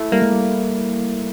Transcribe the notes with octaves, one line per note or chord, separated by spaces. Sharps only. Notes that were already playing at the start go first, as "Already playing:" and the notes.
Already playing: A3 E4
G3 A#3
G#3
G3